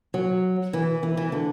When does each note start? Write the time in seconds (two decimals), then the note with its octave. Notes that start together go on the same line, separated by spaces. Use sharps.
0.14 F#3
0.73 E3
1.03 E3
1.17 E3
1.32 D3